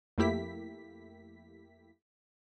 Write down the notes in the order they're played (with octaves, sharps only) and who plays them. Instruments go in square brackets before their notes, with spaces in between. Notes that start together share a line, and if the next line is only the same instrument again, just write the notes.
[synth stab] F2 A3 A#3 E4 G4 B6